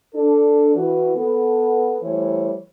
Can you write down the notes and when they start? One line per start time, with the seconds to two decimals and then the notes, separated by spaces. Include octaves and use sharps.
0.14 D4 A4
0.75 E3 F#4 B4
1.15 B3 A4
2.03 E3 G3 A3 C5 C#5